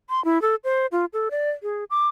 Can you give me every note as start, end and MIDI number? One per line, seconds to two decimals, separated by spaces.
0.10 0.23 84
0.25 0.41 64
0.42 0.55 69
0.64 0.86 72
0.92 1.05 65
1.13 1.29 69
1.31 1.50 74
1.63 1.84 68
1.90 2.08 86